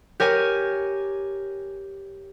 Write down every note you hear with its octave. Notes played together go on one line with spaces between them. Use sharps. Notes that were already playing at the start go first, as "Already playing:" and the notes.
G4 A#4 C#5 G#5